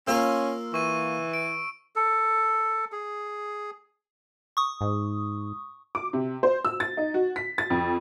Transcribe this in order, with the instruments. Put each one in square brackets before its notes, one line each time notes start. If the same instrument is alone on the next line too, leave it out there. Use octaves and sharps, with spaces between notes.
[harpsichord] A#3 F4 A#4 [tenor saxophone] C#4 [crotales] E6
[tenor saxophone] E3 [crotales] C#6 D#7
[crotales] D7
[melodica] A4
G#4
[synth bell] C#6 D#6
[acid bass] G#2
[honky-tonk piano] D6
C3
C5
E6
A6
D#4
F#4
B6
A6
F2